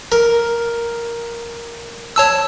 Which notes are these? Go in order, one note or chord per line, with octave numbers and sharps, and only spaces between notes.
A#4
C#5 A5 E6